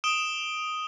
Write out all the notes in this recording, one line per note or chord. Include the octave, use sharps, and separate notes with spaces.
D#6 D7 E7 G7